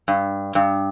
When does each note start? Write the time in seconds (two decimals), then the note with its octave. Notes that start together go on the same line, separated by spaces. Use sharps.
0.08 G2
0.55 G2